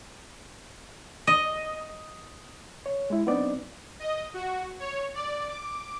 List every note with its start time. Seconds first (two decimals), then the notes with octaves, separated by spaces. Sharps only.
1.27 D#5
2.86 C#5
3.10 G#3 E4
3.27 F#3 B3 C4 D4 D#4 D5
3.99 D#5
4.34 F#4
4.79 C#5
5.14 D5
5.49 D6